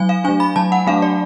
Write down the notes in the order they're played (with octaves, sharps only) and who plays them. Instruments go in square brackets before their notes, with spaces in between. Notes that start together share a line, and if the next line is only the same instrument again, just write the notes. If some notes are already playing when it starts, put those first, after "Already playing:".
Already playing: [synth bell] F#3 G#5
F5
A3 D4 G#5
B5
F#3 A5
F#5
A3 D4 F5
D5